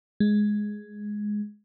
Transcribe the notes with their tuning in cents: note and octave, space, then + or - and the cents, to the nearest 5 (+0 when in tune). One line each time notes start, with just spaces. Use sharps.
G#3 +5